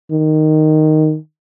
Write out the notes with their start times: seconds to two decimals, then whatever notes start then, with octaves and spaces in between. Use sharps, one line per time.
0.11 D#3